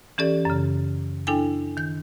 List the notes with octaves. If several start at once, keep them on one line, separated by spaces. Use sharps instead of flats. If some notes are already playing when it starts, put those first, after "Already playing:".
E3 C#4 G4 A4 D5
F#2 C#3
D4 E4 A4 G5 G#5
D#3 G6